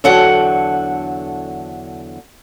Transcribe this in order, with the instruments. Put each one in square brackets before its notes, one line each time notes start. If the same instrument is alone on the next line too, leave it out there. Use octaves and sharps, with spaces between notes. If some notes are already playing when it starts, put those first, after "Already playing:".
[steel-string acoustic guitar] E2 D3 F#3 A4 F#5 G5